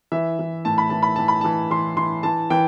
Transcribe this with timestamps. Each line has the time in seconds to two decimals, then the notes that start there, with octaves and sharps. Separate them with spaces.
0.12 E3 E5
0.39 E3
0.65 A2 A5
0.78 B5
0.90 E3 A5
1.03 B5
1.16 E3 A5
1.28 B5
1.41 E3 A5
1.71 E3 C6
1.97 E3 C6
2.23 E3 A5
2.50 E3 G5